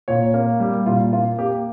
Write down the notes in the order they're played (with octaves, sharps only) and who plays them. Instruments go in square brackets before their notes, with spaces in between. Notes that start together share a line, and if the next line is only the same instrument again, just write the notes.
[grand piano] A#2 C#5
A#3
G3
A#2 F4
A#3 F4
A#3 G4